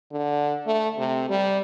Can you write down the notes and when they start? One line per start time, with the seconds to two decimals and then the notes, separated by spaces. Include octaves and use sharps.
0.12 D3
0.67 A3
0.98 C3
1.29 G3